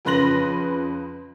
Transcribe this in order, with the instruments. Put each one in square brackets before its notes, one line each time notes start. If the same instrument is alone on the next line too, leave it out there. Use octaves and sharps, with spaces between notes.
[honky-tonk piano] F2 C#3 B4 C6 A#6 F#7